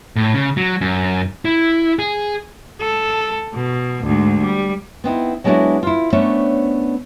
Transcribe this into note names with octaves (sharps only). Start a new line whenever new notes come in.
A2
C#3
F#3
F#2
E4
G#4
A4
B2
D2 G#2
G3
B3 C4 D#4 E4
F#3 G#3 B3 D4 E4 F#4
E4 F4
A3 B3 C#4 D4 C5 C#5